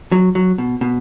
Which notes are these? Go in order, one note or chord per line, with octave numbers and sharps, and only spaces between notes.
F#3
F#3
B2
B2